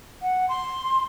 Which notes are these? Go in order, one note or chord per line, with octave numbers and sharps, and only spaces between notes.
F#5
C6